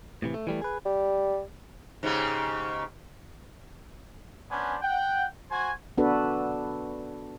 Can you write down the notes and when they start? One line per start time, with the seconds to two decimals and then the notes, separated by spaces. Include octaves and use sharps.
0.22 A2 C3 E3
0.34 A3
0.47 E3 G3 A3
0.62 G#4 B4
0.86 G3
2.03 G#2 C#3 G4
4.51 B3 C#4 D4 C5 G#5
4.81 F#5 G5
5.50 F#4 C5 G#5
5.98 B3 D4 F#4 A4 B4